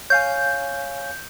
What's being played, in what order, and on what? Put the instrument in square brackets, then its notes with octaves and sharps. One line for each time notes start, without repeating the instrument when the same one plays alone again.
[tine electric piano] C#5 F5 G#5 [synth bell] G6